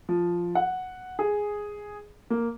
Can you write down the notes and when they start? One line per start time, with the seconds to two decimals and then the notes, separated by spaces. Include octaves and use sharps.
0.09 F3
0.55 F#5
1.19 G#4
2.30 A#3